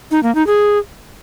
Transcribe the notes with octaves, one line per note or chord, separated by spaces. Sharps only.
D#4
A#3
D#4
G#4